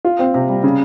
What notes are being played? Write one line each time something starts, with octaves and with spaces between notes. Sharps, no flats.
F4
C4
C3
G3
C#3